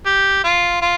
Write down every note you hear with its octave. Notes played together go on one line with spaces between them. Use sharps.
G4
F4
F4